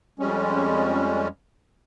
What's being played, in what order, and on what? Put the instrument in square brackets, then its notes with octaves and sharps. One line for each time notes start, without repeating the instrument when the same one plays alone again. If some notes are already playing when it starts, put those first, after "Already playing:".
[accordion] F2 G3 G#3 C#4